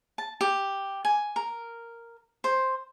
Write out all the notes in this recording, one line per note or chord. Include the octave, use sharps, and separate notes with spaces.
A5
G4
G#5
A#4
C5